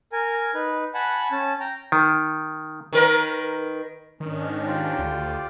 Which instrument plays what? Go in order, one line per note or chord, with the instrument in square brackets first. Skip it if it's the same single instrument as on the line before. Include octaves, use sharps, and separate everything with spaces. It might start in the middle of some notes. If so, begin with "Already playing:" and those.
[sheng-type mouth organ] A#4 G#5
D#4 B4
F#5 G#5 A5 B5 F#6
C#4 A5
G5 A#5
[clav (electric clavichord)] D#3
[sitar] D#3 A#4 B4
[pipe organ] G#2 C#4 D4 [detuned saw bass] D#3
[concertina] F4 G4 D5
[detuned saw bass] D2